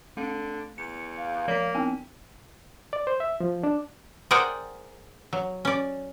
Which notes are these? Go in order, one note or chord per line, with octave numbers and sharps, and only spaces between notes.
D3 A3
E2 C#7
F5
F3 A#3 B6
B3 C4 G5
D5
C5
E5
F3
D4
G#4 A#4 C5 D5 F#5 G5
F#3
C#4 D5